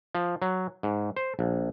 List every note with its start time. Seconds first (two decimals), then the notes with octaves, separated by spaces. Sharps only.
0.15 F3
0.42 F#3
0.83 G#2
1.17 C5
1.39 A#1